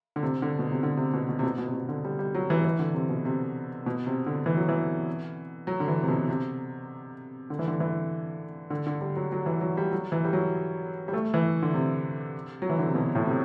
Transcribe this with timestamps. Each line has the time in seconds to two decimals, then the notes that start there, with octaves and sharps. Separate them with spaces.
0.16 D3
0.23 C3
0.42 D3
0.59 B2
0.71 C3
0.83 D3
0.97 C3
1.14 B2
1.29 B2
1.39 C3
1.43 B2
1.58 B2
1.67 C3
1.74 B2
1.89 D3
2.05 G3
2.19 G3
2.35 F#3
2.50 E3
2.65 E3
2.79 D3
2.94 C3
3.09 B2
3.25 C3
3.86 B2
4.07 C3
4.26 D3
4.46 E3
4.57 F#3
4.69 E3
5.67 F#3
5.80 D3
5.88 E3
6.03 C3
6.08 B2
6.29 C3
7.50 D3
7.59 E3
7.67 D3
7.80 E3
8.70 D3
8.87 D3
9.01 G3
9.16 F#3
9.32 F#3
9.46 E3
9.61 F#3
9.77 G3
9.91 F#3
10.12 E3
10.24 G3
10.33 F#3
11.08 G3
11.13 A3
11.34 E3
11.62 D3
11.74 C3
12.62 F#3
12.69 E3
12.79 D3
12.87 C3
12.95 B2
13.15 A2
13.27 C3